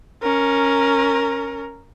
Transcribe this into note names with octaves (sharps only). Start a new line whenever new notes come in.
C#4 A#4